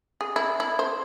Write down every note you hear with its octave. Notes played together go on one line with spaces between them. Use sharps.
G#4
E4
E4
C5